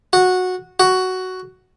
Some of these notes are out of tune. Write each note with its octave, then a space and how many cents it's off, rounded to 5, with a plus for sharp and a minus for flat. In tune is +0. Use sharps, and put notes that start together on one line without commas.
F#4 -15
F#4 +5